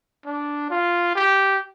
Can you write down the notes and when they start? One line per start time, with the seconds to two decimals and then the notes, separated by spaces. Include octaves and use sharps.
0.26 D4
0.70 F4
1.15 G4